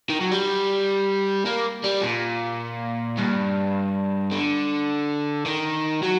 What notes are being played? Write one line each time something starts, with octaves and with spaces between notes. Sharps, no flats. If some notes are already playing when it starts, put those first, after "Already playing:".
D#3
F#3
G3
A#3
G3
A#2
G2
D3
D#3
F#3